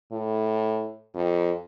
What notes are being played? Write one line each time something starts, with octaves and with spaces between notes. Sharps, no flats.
A2
F2